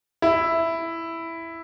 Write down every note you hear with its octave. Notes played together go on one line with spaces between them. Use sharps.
E4